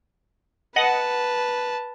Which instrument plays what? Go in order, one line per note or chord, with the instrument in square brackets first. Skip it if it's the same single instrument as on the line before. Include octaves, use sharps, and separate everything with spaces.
[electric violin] B4 A5 [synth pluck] D#5 F#5